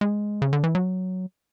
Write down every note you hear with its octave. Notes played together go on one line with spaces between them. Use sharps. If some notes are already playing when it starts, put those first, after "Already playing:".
G#3
C#3
D3
E3
F#3